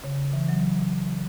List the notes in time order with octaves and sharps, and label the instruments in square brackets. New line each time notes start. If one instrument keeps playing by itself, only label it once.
[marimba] C#3
E3
F#3